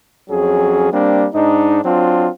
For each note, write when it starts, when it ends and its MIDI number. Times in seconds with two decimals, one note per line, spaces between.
0.29 0.89 41
0.29 0.89 54
0.29 0.89 61
0.29 0.89 68
0.91 1.26 55
0.91 1.26 58
0.91 1.26 60
0.91 1.26 62
1.33 1.78 44
1.33 1.78 62
1.33 1.78 63
1.84 2.28 54
1.84 2.28 60
1.84 2.28 62
1.84 2.28 65